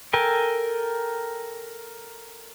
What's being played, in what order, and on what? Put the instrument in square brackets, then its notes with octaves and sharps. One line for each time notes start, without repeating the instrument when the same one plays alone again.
[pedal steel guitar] A4 A#4 G5 G#5